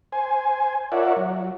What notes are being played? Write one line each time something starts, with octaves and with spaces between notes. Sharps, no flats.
C5 G#5
F4 A#4 C#5 D5 E5 F#5
F#3